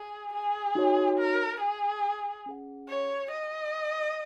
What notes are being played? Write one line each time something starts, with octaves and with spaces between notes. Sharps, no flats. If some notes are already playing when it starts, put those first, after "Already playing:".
Already playing: G#4
G#4
D#4 F#4 C#5
A#4
G#4
C#4 G#4 F#5
C#5
D#5